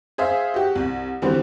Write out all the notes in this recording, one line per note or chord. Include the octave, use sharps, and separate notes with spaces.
G#4 C5 E5 F5
F#4 G4
C2
D3 E3 G3 C4 F#4 C5